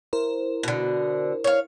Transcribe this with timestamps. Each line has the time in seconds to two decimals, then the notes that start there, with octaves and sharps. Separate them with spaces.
0.13 E4 A#4 C5
0.63 B2 D3
1.44 C#5 F5